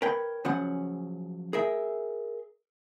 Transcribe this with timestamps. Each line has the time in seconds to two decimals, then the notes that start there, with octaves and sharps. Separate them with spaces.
0.02 A#4 B4 C#5 G5
0.45 C#3 F3 F#3 C#4 F#5
1.53 G#4 A#4 E5